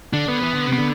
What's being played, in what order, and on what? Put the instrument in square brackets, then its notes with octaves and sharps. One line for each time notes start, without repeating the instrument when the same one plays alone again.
[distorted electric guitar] D3 [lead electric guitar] D4
[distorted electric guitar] D3 [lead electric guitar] B3
[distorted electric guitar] E3
D3
C3
[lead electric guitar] B3
[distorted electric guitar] D3